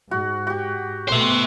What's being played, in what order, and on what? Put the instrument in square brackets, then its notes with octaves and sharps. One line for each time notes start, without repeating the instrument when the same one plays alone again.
[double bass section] G#2 [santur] F#4
[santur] F#4 G4
[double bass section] B2 A3 B3 [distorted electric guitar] C5 E5